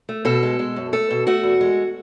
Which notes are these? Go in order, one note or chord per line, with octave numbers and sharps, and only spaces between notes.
A3
B2 A4
G#3
G#3
F#2
A3 A4
B2
A3 F#4
E2
G#3